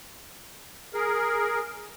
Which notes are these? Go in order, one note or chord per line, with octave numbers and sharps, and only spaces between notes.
G#4 A#4